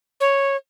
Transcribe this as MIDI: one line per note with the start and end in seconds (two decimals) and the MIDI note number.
0.20 0.56 73